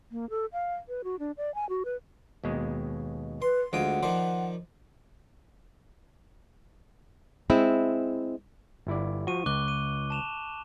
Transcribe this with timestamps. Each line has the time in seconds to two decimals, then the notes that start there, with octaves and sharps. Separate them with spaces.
0.12 A#3
0.30 A4
0.53 F5
0.88 B4
1.04 F#4
1.19 D4
1.37 D5
1.55 G#5
1.69 F#4
1.85 B4
2.44 D#2 B2 G#3
3.42 B4 C6
3.73 D2 G#3 F4 F#5 G5 D#6
4.03 D#3 F3 C5 D5
7.50 G#3 C4 E4
8.87 G1 E4 D5
9.27 F3 F#4 C#6 D#7
9.46 C#2 D6 F#6 G7
9.68 D#7
10.10 A5 E7 F7